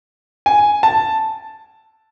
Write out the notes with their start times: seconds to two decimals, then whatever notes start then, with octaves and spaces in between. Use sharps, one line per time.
0.46 G#5
0.83 A5